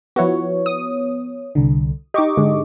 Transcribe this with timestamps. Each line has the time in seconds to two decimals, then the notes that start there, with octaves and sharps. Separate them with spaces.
0.16 F3 B3 E4 F#4 C#5
0.66 D#6
1.55 C2 D3
2.14 D#4 G4 D#5 C#6 D6
2.37 G#2 D3 G#3